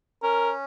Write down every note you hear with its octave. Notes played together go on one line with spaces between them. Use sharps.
C#4 A#4